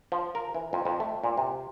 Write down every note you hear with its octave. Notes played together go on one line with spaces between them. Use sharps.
F3
A#4
E3
F2
F2
A3
A#2
C3